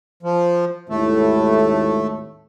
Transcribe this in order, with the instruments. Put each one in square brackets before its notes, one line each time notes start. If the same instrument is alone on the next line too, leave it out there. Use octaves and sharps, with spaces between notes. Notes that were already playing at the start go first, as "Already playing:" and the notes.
[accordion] F3
[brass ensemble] G#1 D#2 A2 [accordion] A3